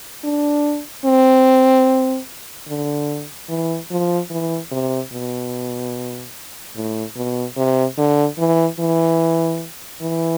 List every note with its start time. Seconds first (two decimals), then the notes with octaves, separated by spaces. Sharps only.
0.24 D4
1.05 C4
2.68 D3
3.49 E3
3.91 F3
4.30 E3
4.71 C3
5.12 B2
6.76 A2
7.16 B2
7.57 C3
7.98 D3
8.38 E3
8.79 E3
10.01 E3